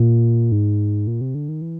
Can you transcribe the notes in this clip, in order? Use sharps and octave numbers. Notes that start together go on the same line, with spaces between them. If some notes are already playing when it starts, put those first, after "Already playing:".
Already playing: A#2
G#2
A#2
C3
D3
D#3
E3